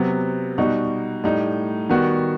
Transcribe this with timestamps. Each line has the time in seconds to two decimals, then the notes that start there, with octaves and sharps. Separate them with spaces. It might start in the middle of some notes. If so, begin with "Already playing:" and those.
Already playing: C3 F#3 B3
0.58 B2 G3 D#4 F#4
1.24 A2 G3 D#4
1.89 D#3 G3 B3 F#4